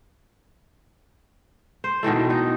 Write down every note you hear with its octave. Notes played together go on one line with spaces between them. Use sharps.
C5
B2 D#3 E3 A3
D#4